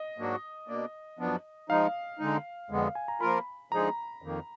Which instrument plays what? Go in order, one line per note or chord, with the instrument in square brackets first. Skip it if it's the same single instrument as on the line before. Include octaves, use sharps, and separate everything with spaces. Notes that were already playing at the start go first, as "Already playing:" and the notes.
Already playing: [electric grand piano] D#5
[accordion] G#2 F#3 A#3 D4 F#4
B2 A#3 D4
F#2 F3 B3 D4
[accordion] F3 G#3 D#4 [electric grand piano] F5
[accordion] D3 G#3 D#4
F2 D3 G#3 B3
[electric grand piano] F5
G#5
A#5
[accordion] F3 A#3 F4 A#4 [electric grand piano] B5
[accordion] D3 F3 G#3 D#4 G#4 [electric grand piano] A#5
[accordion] F2 D#3 A#3